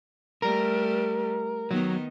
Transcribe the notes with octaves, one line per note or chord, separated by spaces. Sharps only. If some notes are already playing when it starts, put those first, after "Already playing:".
G3 A3 A#4
D#3 F#3 B3 D#4